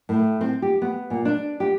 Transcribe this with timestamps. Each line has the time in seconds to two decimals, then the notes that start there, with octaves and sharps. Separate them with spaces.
0.09 A2
0.41 C4
0.62 G4
0.82 B3
1.10 A#2
1.25 D4
1.60 G4